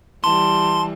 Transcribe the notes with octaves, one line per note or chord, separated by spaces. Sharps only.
E3 G3 A5 C6